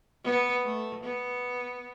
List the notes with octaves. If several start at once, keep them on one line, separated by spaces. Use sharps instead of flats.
B3
A3
B3